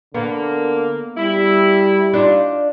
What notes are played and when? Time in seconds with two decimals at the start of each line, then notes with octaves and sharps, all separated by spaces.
0.14 D3 A#3 B3
1.17 G3 E4
2.13 D4 D#4 F4